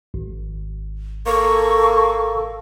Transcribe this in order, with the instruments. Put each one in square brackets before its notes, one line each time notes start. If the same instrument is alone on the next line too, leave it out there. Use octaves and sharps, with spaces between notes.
[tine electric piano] G#1
[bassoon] A#3 [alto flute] A4 [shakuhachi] C#6